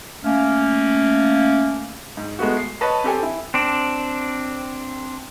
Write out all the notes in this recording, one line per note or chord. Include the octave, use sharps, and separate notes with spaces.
A3 A#3 C#4
G#2
G#3 A3 B3 F#4
C7
B4 C#5 D#5 A5 B5
C4 G4 A4 G#5
E4
C4 D4